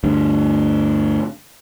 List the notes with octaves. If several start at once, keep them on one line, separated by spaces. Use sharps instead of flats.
D2 G2